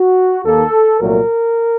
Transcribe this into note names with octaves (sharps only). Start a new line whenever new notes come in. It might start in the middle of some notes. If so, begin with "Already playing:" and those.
Already playing: F#4
D#2 D#3 A#3 A4
C2 A#2 F#3 A3 A#4